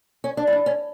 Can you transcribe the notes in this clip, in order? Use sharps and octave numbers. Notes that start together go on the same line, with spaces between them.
C#4
D4
E4
D4
C#4